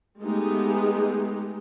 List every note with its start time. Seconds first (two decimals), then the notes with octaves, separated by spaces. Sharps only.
0.22 G#3 A3 B3 D#4 G4 G#4